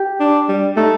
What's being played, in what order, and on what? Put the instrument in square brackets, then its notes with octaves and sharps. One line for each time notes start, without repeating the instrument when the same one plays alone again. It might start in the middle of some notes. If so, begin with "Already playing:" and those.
Already playing: [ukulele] G4
[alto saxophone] D4
G3
[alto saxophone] A3 [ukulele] D#4